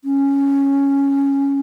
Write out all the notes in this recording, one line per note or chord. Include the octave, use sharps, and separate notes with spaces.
C#4